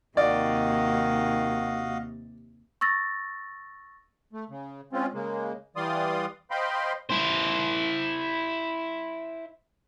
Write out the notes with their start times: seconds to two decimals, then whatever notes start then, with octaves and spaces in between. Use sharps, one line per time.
0.17 D#2 C3 D#3 F#4 D5 D#5 F5
2.81 C#6 E6 A6 A#6
4.33 A3
4.50 C#3
4.93 G#3 C4 C#4 F4
5.14 C#3 G#3 A#3
5.76 E3 G3 D5 F5 C6 D#6
6.51 C5 D#5 F5 G5 B5 C6
7.10 E4 C5